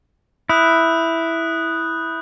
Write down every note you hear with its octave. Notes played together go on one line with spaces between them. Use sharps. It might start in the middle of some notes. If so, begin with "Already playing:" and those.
E4 D#6 F#6 G6